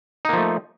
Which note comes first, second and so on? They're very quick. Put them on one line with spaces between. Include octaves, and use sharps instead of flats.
D#4 A#3 F3 A3